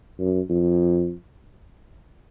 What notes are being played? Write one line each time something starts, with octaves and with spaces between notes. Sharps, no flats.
F#2
F2